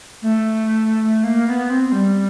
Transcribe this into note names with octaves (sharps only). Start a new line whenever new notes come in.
A3
A#3
B3
C4
G3